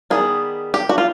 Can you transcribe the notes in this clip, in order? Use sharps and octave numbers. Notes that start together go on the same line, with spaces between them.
D#3 G3 B3 G#4
G4
F#4
F4